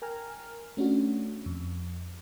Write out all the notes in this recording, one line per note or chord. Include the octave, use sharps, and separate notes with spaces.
A#4 G5 G#5 A#5 F6
A3 C#4 D4 F#4
F2